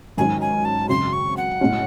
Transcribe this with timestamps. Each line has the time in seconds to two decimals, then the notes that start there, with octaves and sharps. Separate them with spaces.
0.17 G#2 D#3 F#3 C#4 G#5
0.41 G#5
0.65 A5
0.89 F#2 C#3 F#3 C4 C6
1.13 C#6
1.37 F#5
1.60 A2 G#3 C#4 F#4